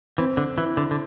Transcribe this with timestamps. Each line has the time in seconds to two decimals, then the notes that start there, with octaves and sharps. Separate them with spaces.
0.18 E3 C4
0.37 D3
0.57 E3 E4
0.77 D3
0.91 D3